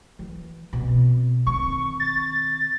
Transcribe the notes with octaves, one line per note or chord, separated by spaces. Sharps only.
E3
B2 C4
D#3 C4 C#6
A6